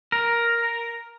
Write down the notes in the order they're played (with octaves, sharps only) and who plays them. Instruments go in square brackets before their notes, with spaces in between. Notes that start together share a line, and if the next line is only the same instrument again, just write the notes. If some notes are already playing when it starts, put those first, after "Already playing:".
[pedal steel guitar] A#4